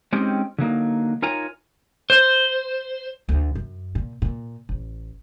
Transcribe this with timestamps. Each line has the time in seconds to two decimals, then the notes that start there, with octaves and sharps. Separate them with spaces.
0.13 G#3 C4 C#4 D#4 G4
0.58 D3 F#3 A#3 D#4
1.22 D#4 F4 A#4 C#5 G#5 A#5
2.10 C5
3.29 D2
3.55 F#2
3.95 A#2
4.22 A#2
4.69 A1